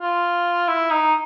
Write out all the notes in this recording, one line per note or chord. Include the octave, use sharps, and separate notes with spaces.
F4
E4
D#4